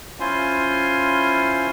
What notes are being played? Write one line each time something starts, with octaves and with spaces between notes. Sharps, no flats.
C#4 E4 F4 C5 G#5 C6